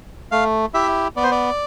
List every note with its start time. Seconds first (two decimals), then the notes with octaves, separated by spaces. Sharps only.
0.31 A3 F5
0.74 E4 G4 E5
1.16 B3 D5
1.23 C5
1.31 D5